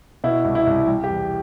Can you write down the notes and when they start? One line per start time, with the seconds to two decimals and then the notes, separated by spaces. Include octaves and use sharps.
0.24 B2 E4
0.45 C2
0.55 E4
0.67 C2
0.87 G3
1.04 G4
1.09 E2